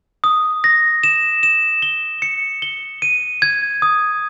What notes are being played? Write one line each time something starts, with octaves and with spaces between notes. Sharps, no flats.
D#6
A#6
E7
E7
G7
C#7
G7
D#7
G#6
D#6